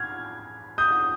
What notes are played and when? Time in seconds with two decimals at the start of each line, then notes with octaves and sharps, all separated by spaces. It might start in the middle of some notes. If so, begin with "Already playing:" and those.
Already playing: F6 G#6
0.78 D#6 G6